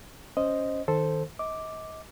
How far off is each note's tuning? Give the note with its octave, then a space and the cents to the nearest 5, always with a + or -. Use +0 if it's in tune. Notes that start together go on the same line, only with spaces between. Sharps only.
C#4 +0 C5 +0 D#5 +0
D#3 +5 A4 +0 C5 +0
D#5 +35 D6 +0